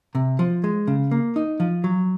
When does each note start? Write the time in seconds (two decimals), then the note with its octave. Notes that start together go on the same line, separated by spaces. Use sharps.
0.15 C3
0.39 F3
0.64 G#3
0.87 C#3
1.11 A#3
1.36 D#4
1.60 F3
1.84 F#3